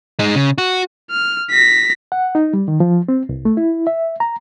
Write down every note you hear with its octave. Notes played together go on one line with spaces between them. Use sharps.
G#3 D#4
C#3
F#4
F6
A#6 B6
F#5
D#4
G3
D#3
F3
C4
C2
A3
E4
E5
A#5